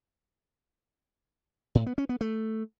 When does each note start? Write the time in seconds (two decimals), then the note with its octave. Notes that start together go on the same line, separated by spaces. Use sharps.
1.75 A2
1.86 B3
1.98 C#4
2.09 B3
2.21 A3